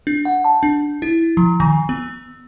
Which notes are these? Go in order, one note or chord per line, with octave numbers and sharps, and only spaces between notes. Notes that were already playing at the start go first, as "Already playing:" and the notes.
D4
F#5
A5
D4
E4
F3
D#3
B3